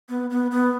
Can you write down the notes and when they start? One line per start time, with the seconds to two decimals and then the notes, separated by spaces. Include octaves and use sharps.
0.09 B3
0.30 B3
0.51 B3